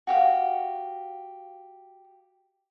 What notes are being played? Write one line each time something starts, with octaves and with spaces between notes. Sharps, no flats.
F#4 G4 F5